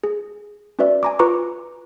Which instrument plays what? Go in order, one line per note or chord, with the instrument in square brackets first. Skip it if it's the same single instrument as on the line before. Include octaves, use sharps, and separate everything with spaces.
[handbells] G#4
C#4 F#4 B4 D5 E5
G#5 A#5 D6
F4 B4 A#5 C#6 D6